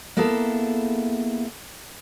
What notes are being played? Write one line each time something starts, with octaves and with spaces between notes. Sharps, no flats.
A#3 B3 E4 G#4 A4